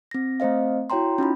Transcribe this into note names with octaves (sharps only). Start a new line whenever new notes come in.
C4 A#6
A3 C4 C5 D#5 F5
E4 F#4 C#5 G5 A#5 C6
C#4 D#4 F4 B5